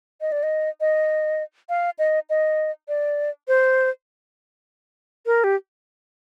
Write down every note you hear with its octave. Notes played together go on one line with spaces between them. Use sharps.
D#5
D5
D#5
D#5
F5
D#5
D#5
D5
C5
A#4
G4